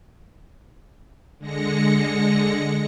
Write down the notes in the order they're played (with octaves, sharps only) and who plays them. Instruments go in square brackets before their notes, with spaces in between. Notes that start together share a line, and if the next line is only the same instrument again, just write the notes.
[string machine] D3 G#3 A#6 C#7